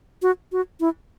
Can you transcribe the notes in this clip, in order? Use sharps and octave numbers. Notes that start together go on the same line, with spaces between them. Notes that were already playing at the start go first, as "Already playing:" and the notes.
F#4
F#4
E4